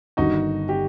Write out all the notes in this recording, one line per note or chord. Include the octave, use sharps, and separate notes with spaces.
G1 G2 D#3 D#4 F#4
G4